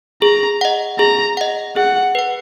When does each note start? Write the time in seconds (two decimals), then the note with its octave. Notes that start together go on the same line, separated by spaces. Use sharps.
0.22 G#4 A#5
0.61 D#5 F#5
0.99 G#4 A#5
1.37 D#5 F#5
1.76 G#4 F#5
2.15 B4 F#5